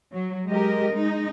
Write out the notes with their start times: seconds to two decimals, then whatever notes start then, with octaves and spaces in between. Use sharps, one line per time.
0.13 F#3
0.49 G#3 G4 A#4 D#5
0.92 G#3 D#4